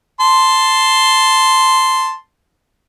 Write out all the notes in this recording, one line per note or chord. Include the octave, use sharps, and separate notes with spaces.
A5 C6